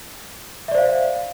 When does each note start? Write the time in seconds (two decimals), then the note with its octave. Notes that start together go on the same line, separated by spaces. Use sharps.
0.68 E5
0.71 D5
0.75 C5
0.78 F5